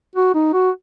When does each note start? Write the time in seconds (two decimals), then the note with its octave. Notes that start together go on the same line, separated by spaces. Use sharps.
0.16 F#4
0.34 D#4
0.53 F#4